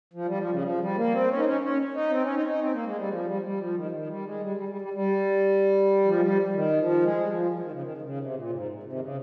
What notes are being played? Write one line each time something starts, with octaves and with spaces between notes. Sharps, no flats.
F3
G3
F3
C#3
F3
G3
A#3
C4
C#4
D#4
C#4
C#4
D#4
C4
C#4
D#4
D#4
C4
A#3
G#3
G3
F3
G3
G3
F3
D#3
F3
D#3
G3
G#3
G3
G3
G3
G3
G3
F3
G#3
G3
D#3
F3
G#3
G3
F3
F3
D#3
C#3
D#3
D#3
C#3
C3
A#2
G#2
C3
D#3
C#3